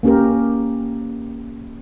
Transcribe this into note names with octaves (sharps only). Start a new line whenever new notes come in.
A#3 C#4 G4 A#4